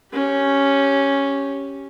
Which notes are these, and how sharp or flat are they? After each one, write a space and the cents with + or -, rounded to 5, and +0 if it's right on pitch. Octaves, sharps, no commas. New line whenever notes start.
C#4 +0 G4 +0